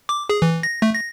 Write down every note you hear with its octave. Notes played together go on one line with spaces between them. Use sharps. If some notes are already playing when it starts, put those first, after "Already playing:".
D6
G#4
E3
A#6
A3
A#6